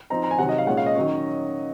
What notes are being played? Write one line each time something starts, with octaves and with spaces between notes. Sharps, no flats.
F3 C4 D#4 A#5
A#5
G#5
C3 D#3 F#3 F#5
D#5
F5
A#2 G#3 C#4 F#5
F5
D#5
D#3 F#3 C#4